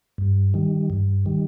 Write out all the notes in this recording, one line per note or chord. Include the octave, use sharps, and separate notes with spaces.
G2
D#3 G3
G2
D#3 G3